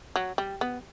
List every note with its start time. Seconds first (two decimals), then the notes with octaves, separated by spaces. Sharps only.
0.16 F#3
0.38 G3
0.61 B3